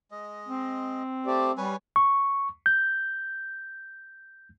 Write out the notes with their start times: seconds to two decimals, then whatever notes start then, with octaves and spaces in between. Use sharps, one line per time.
0.11 G#3 D#5
0.48 C4
1.26 A3 G4 C5 D5
1.58 G3 B4 C#5 G#5
1.96 C#6
2.66 G6